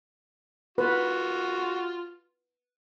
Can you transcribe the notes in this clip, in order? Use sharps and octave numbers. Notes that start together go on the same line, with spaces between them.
F4 F#4 B4